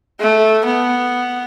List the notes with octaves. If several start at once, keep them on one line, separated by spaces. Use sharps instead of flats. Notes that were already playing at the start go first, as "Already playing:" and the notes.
A3
B3